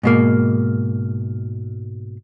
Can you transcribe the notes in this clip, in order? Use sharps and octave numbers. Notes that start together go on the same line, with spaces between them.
G#2 B2 A#3